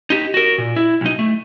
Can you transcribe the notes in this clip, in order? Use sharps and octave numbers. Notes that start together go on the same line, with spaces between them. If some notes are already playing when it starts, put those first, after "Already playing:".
D#4 G4
F#4 A#4
A#2
E4
B1 D#4
A3